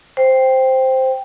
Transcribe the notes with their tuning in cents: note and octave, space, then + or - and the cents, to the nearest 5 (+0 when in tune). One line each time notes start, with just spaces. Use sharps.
C5 +0 G5 +0